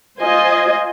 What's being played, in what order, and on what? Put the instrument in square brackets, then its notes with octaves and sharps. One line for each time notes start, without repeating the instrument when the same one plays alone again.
[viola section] F4 C5 D#5 G#5